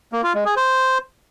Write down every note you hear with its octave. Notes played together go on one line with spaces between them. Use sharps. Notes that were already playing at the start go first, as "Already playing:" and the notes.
A#3
F4
G#3
G#4
C5